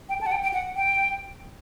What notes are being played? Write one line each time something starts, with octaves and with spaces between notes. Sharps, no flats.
G5
A5
F#5
G5
G5
F#5
G5